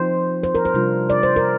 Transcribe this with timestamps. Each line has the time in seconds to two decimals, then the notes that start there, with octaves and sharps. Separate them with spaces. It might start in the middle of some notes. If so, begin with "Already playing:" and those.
Already playing: F3 C4 D#4 C5
0.43 C5
0.55 A#4
0.65 C5
0.74 C3 G3 D4 F4
1.10 D5
1.23 C5
1.36 A#4